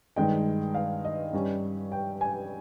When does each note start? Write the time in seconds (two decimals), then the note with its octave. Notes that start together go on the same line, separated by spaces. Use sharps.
0.16 G2 D#3 G#3 D#4 G5
0.75 F5
1.05 D#5
1.33 G2 G3 C#4
1.92 G5
2.21 G#5